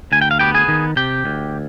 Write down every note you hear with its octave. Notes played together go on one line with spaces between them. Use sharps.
D2 G#5
G5
F5
B3 G4 G5
G#4 G#5
D#3
C3 G4 G5
D2